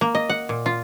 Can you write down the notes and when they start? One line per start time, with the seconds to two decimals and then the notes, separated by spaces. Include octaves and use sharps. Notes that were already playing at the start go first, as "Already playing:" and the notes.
0.01 A#3
0.15 D#5
0.29 F#5
0.49 A#2
0.66 F4